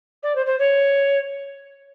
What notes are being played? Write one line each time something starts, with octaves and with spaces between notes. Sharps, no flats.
D5
C5
C5
C#5